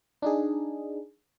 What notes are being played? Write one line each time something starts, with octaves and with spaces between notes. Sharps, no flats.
D4 D#4 G#4